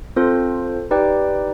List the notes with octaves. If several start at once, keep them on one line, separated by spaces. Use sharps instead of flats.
C4 F4 A4 C5
D#4 G4 B4 D5 G5